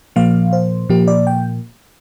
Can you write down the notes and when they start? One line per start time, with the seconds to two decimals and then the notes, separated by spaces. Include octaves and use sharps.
0.16 A#2 F3 A#3 F5
0.53 C5
0.89 A#2 F3 A#3 G4
1.08 D5
1.27 G5